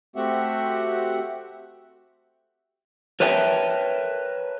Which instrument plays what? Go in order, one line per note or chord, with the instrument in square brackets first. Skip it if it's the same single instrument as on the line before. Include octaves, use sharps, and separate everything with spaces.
[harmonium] A3 C4 F#4 G4 E5 F#5
[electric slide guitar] A#4 B4 C#5 E5 G5 A5